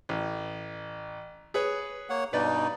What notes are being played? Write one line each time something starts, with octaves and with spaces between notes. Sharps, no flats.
A1
G#4 B4 C#5
A#3 C#5 F#5
G2 B2 D#4 B4 D5 D#5